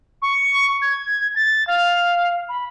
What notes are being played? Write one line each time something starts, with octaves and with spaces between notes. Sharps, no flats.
C#6
G#6
A6
F5
B5